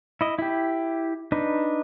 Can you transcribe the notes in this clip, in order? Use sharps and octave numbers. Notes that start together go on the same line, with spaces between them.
E4 D#5
E4 G4
D4 D#4 B4